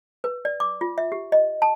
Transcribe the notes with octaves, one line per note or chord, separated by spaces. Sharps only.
B4
D5
D6
F4
E5
G4
D#5
A5